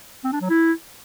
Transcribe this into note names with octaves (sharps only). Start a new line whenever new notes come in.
C4
D4
F#3
E4